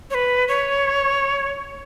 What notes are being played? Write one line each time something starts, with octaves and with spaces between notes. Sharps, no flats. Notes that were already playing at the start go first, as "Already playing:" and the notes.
C#5
B4
C#5